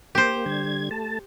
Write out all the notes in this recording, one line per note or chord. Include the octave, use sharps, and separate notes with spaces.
A#3 G4 C5
D3 G3 G#6
A3 A5